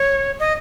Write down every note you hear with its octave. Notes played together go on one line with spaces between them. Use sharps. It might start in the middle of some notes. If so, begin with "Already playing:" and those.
Already playing: C#5
D#5